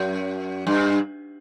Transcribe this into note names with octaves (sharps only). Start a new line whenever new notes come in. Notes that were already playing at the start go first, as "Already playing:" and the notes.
Already playing: F#2
G2